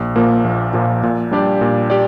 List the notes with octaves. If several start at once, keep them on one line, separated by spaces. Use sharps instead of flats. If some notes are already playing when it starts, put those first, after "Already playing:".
Already playing: A#1
A#2 F3 A#3
A#1
A#2 F3 A#3
A#2
G3 D4 G4 D5
A#2
G4 D5